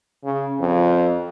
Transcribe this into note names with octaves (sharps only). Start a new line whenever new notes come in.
C#3
F2